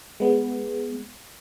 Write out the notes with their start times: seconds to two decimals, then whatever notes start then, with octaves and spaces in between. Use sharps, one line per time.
0.20 G#3 B3